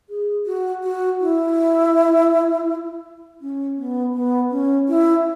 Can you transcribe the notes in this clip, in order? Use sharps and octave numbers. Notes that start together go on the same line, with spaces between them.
G#4
F#4
F#4
E4
C#4
B3
B3
C#4
E4